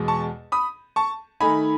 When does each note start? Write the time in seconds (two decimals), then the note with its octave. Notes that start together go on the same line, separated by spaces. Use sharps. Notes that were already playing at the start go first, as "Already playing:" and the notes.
Already playing: E2 B2 G#3
0.08 A5 C#6
0.52 B5 D#6
0.96 A5 C#6
1.40 D#3 A3 D#4 G#5 B5